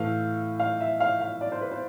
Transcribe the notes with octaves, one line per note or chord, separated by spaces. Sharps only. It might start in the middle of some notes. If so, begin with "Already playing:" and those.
Already playing: A2 E3 A3 F5
F5
E5
F5
F5
D5
C5
B4
C5